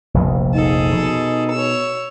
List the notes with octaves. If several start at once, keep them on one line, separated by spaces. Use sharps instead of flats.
F1 A#1 D#2
D#4 G#4 A4
B2
C#5 E6